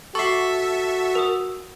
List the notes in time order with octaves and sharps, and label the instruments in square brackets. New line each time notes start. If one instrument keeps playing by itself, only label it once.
[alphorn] F#4 [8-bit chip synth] A4 E5 [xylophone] C#6 D6 C7
[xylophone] A#4 D#6 E6